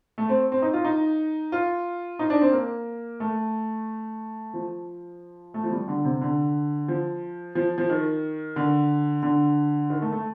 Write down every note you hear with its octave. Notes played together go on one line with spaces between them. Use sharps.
A3
C4
C4
D#4
F4
D#4
F4
D#4
D4
C4
A#3
A3
F3
A3
F3
G3
D3
C3
D3
F3
F3
F3
D#3
D3
D3
D#3
A3
A3